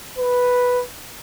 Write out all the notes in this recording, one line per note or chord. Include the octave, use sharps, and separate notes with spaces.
B4